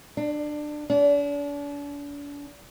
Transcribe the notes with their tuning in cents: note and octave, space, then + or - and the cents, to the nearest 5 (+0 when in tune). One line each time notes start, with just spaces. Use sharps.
D4 +20
D4 -40